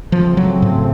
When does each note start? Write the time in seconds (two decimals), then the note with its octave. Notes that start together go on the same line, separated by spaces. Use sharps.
0.12 F#2 C#3 F3 A3 C4
0.37 F#3
0.62 A2